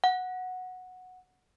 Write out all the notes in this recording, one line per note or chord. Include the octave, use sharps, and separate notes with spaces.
F#5